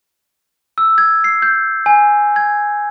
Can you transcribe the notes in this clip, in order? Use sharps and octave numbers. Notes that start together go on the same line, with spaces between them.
E6
G#6
C7
G6
G#5
G#6